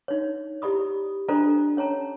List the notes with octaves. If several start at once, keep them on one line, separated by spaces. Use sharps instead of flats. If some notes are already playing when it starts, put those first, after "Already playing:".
D#4 C#5
E4 G4 D5 B5 D#6
D4 F4 A4 C5 D5 A#5
C#4 C#5 A5 A#5